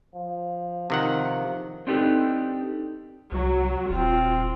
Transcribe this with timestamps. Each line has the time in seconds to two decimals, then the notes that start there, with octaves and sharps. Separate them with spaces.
0.15 F3
0.90 C3 D#3 F3 F#5
1.87 C4 D4 D#4 G4 A4 B4
3.32 C2 F#3
3.90 D#1 C4 F4